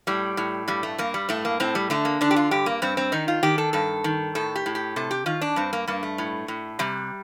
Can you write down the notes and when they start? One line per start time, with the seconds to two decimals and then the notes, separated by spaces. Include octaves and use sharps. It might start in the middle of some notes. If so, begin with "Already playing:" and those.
0.07 A2 G3
0.37 A2
0.68 G2 G3
0.83 A3
0.98 G2 A#3
1.14 G3
1.29 A2 A3
1.45 A#3
1.60 A2 C4
1.75 G3
1.90 D3 A3
2.05 A#3
2.21 D3 D4
2.31 G4
2.36 F4
2.51 G2 G4
2.66 A#3
2.82 G2 C4
2.97 C4
3.12 D#3 D#4
3.28 F4
3.43 D#3 G4
3.58 A4
3.73 G2 A4
4.04 D#3
4.35 A2 A4
4.56 G4
4.66 A2
4.75 G4
4.96 C3 A4
5.11 G4
5.26 D#3 F4
5.41 D4
5.56 G2 C4
5.73 A#3
5.88 G2 A#3
6.03 A3
6.18 A2
6.48 A2
6.79 C3 G3